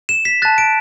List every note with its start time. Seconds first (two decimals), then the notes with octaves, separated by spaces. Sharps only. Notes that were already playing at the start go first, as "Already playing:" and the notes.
0.09 E7
0.25 B6
0.42 A5 F#6 A6
0.58 D7